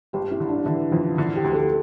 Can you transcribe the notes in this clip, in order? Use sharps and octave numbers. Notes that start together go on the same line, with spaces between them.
G1 G4
E4
D3
D4
D3 E3
F2 F3
D3 E4
G4
D2
A4